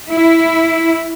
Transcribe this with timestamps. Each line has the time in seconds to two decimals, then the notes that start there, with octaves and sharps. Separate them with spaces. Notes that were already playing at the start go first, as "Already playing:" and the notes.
0.11 E4